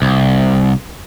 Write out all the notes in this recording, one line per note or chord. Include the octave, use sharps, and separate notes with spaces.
C2